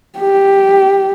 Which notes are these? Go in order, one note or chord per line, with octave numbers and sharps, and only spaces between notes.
G4